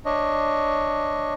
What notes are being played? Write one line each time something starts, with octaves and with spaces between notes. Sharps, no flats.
D4 C#5 D#5